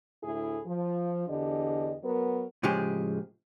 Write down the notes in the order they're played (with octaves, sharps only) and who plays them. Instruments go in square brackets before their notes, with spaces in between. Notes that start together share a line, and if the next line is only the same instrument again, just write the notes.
[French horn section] D2 A2 E4 G#4 A4
F3
E2 D3 D4 G4 D#5
F#3 B3 A#4
[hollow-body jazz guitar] A2 C#3 F3 G#3 G4 G#4